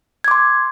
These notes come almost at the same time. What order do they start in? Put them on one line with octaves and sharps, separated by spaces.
G#6 D6 C6